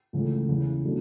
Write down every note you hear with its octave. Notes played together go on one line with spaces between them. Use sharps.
C#2 C#3 E3 A3
E2 C#3 E3
B2 F#3 A3 D4